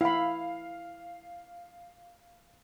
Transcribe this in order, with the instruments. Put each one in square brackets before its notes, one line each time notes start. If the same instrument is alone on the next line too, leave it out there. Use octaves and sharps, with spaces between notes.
[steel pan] E4 B5 [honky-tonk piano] F5